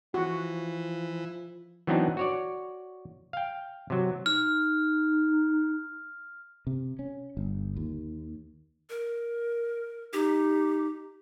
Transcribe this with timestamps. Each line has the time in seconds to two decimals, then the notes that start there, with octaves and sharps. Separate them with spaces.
0.14 E3 F3 F#4
1.87 E3 F#3 B3 C4 D4 D#4
2.17 F#4 C#5 D5
3.33 F5 G5
3.90 C3 F#3
4.26 D#4 F6
6.67 C3
6.99 C#4
7.37 G1
7.76 D#2
8.90 A#4
10.13 D#4 G4